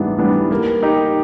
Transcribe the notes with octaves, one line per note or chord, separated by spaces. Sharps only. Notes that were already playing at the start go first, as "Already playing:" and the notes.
Already playing: G#2 E3 G3 B3 D4
E3 G3 B3 D4
A#3
D#4 G4